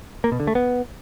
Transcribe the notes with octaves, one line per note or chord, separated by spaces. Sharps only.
A#3
B2
D3
A3
B3